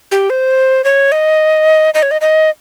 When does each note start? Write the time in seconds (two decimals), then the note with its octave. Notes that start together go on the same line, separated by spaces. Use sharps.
0.12 G4
0.30 C5
0.84 C#5
1.12 D#5
1.94 D#5
2.03 C#5
2.11 D#5
2.21 D#5